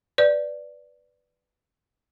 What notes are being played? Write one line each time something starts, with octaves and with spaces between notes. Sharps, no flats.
B4 D5